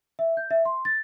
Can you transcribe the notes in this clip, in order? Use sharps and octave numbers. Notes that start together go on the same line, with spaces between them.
E5
G6
E5
C6
A6